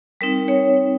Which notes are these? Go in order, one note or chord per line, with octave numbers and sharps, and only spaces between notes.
G3 C4 D#4 A#4
C#5